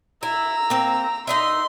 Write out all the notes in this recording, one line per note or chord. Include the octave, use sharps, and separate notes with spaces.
E4 A#5 E6
A#3 C4
D#4 D#5 E5 C6